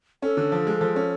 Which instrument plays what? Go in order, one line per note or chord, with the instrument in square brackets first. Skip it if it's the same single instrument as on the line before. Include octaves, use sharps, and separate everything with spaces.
[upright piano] C#4 [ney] A4
[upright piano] D3
F3
G#3
F3
C#4